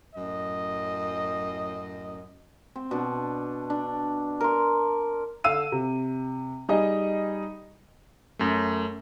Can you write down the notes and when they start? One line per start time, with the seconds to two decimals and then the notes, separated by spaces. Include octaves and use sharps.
0.15 F#2 A2 D#5
2.76 C4
2.91 B2 D4
3.70 D4
4.40 A#4 C6
5.44 D3 F5 E6 D#7
5.72 C3
6.69 G3 D#4 G#4 D#5
8.39 F#2 A3